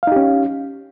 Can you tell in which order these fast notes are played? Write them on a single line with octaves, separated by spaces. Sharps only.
F5 D#4 G4 C#4